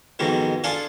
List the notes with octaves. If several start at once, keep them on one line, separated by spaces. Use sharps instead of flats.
F2 G#2 B2 D#3 F#3
D4 F4 G#4 A4